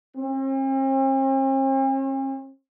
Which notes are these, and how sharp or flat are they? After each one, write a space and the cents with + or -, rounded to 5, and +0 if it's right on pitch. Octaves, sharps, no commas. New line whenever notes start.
C4 +45